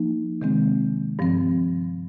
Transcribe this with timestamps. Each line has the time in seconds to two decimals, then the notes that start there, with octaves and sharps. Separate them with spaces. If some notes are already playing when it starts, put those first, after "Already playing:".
Already playing: F3 A#3 D#4
0.41 C3 D#3 G#3 C4
1.19 G2 F3 C4